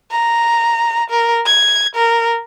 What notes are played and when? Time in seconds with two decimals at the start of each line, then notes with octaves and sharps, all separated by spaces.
0.11 A#5
1.10 A#4
1.46 G#6
1.95 A#4